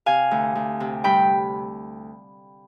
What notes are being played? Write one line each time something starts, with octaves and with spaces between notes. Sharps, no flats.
C3 F5 G#5
D2
D2
C3
G2 G5 B5